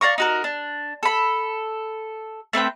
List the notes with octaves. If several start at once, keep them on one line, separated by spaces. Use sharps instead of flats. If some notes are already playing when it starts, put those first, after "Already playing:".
D5 F5 A#5 C#6
D#4 F#4 A#4
D4
A4 B5
A3 C4 B4 G5